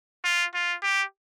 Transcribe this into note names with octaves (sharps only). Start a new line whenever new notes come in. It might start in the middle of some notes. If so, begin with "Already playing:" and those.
F4
F4
G4